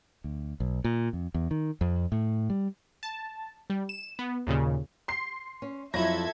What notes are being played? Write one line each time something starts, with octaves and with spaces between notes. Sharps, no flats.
D2
B1
A#2
F2
E2
D#3
F2
A2
G3
A5
G3
E7
B3
D#2 A#2 C#3
C6 C7
C#4
F2 F#3 E4 A4 E5 G#6 A#6